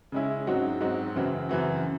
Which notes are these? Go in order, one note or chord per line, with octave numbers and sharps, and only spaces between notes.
C#3 G#3 C#4 E4
G#2 F#3 C4 D#4 F#4
G#2 F#3 C4 D#4 F#4
F#2 C#3 E3 C4 F#4
F#2 C#3 E3 C4 F#4